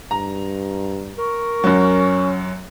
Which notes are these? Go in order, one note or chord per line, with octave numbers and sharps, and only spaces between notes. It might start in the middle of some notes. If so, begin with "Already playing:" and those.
G2 A#5
A#4 C#6
F#2 F#3 C#4